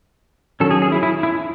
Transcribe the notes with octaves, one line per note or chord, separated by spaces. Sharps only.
D#3 F#3 C#4 A4
G#4
G#4
E4
E4
E4